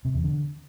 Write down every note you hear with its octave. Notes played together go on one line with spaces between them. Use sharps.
C3
E2
D3